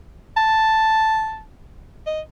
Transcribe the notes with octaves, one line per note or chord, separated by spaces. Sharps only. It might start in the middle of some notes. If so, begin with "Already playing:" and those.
A5
D#5